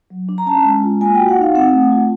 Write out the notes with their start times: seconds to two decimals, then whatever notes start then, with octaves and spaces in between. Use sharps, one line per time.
0.10 F#3
0.29 D4
0.38 A#5
0.46 C#4 A5
0.65 G#3
0.83 F4
1.01 A#3 G#5
1.15 G5
1.19 F#4
1.29 F#5
1.37 D#4 F5
1.55 C4 F#5
1.73 A3
1.92 F4